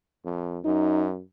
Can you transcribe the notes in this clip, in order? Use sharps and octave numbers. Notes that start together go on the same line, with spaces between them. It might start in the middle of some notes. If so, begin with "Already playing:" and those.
F2
F#2 D#4